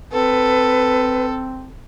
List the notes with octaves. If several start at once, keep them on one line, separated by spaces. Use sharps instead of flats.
C4 A4 B4